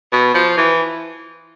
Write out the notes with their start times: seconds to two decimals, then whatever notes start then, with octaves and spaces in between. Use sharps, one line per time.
0.12 B2
0.34 F3
0.57 E3